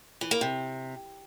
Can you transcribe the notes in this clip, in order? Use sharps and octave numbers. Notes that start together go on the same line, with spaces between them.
E3
A#3
C3